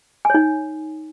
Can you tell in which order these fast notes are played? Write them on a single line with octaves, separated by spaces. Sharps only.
G#5 C#5 D#4